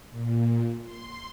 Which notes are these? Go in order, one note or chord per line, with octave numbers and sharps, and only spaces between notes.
A#2
C6